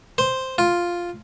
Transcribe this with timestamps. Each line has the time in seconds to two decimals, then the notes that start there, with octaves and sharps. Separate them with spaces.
0.18 C5
0.58 F4